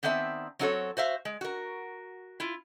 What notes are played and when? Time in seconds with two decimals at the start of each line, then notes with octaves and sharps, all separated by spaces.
0.03 D#3 B3 C4 D5 E5 A5
0.59 F#3 C4 D4 F#4 A4 C#5
0.97 F#4 C5 E5 F5
1.25 G#3
1.41 F#4 A#4
2.40 E4 F4